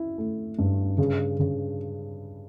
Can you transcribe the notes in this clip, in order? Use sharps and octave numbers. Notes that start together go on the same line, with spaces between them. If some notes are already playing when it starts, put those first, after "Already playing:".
Already playing: E4
A3
G2
C#3
C#3